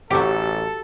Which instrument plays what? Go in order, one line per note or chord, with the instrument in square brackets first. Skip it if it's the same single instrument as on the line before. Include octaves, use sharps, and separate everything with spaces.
[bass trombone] A1 [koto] F#3 G4 [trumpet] A4